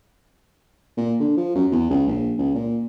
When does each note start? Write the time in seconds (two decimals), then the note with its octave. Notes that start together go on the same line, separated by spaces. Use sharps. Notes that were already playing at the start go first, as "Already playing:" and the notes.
0.97 A#2
1.20 D3
1.37 F3
1.55 F#2
1.72 E2
1.90 C#2
2.07 A#1
2.38 C#2
2.55 A#2